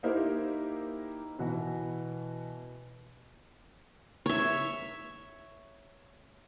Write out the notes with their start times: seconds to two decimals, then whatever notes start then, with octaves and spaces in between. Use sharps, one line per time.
0.03 A#3 D#4 E4 G4 A#4 C5
1.39 B2 E3 F#4
4.26 C#5 E5